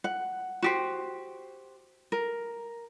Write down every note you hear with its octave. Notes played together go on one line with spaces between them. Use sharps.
F#5
F#4 G4 C5
A#4